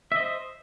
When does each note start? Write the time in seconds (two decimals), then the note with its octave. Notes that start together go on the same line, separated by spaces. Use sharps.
0.12 E5
0.16 D#5
0.20 C5